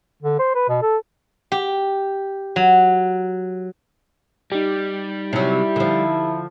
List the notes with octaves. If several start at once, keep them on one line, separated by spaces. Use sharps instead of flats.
D3
C5
B4
B2
A4
G4
F#3
G3 D#4 G4
C3 F#3 E4
D3 F3